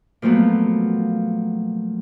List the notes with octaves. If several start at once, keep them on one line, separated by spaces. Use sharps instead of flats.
A#2 F3 F#3 A3 B3